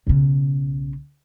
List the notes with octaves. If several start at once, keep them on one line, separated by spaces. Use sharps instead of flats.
B1 C#3